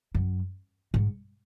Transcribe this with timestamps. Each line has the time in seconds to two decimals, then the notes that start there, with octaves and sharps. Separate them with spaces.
0.15 F#2
0.94 G#2